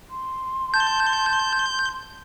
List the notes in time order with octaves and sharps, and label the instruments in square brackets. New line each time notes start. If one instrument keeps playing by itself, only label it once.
[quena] C6
[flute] A5 [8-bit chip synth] G6